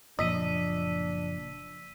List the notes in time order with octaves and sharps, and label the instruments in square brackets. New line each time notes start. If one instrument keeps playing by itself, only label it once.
[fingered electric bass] F#1 A#2 F3 [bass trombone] D4 [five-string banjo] D#5 [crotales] E6 B6 D#7